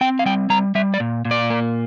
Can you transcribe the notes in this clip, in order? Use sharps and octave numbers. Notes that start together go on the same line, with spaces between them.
C4 G5
F5
G3 G5
G3 A#5
G3 E5
D5
A#2
A#2
D5
A#3